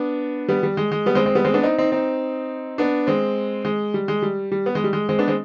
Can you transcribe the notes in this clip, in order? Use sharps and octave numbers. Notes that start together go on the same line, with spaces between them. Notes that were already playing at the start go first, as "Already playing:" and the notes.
Already playing: B3 D4
G3 B3
G3
G#3
G#3
G3 B3
G#3 C4
G#3 C4
G3 B3
G#3 C4
B3 D4
C4 D#4
C4 D#4
C4 D#4
B3 D4
G#3 C4
G#3
G3
G#3
G3
G3
B3
G#3
G3
G#3
G#3 C4
B3 D4
G#3 C4